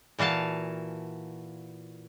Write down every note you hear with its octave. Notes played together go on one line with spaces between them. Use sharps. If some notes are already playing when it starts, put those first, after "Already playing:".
A#2 E3 F#4 F5 A5